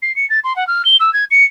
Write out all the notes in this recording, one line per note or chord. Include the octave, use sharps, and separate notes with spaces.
C7
C#7
A6
C6
F#5
F6
G7
E6
G#6
C#7